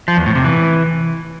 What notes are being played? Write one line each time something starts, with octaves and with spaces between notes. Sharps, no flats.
F3
E2
A2
C3
E3